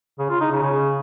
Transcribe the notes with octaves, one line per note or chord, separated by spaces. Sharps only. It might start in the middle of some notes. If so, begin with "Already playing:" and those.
C#3
F4
D#4
C#3
C#3